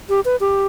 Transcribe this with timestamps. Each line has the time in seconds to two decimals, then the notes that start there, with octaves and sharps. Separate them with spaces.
0.09 G4
0.25 B4
0.40 G4